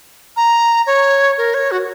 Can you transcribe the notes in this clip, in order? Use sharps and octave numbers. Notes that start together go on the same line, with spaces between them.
A#5
C#5
A#4
C#5
F#4